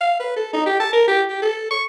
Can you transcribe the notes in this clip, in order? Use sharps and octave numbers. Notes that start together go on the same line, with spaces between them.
F5
B4
A4
D#4
G4
A5
A#4
G4
G4
A4
C#6